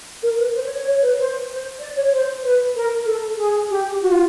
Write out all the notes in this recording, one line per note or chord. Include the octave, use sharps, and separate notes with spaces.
A#4
B4
C5
C#5
C#5
C#5
B4
C5
C5
D5
C#5
C5
B4
A#4
A4
G#4
G4
F#4
F4